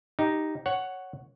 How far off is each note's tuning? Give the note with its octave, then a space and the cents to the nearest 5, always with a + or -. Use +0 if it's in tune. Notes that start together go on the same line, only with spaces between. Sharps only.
D#4 +0 G4 +0
C#5 +0 F#5 +5